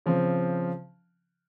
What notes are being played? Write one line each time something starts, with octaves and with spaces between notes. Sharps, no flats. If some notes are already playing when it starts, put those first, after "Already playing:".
C#3 F3 C4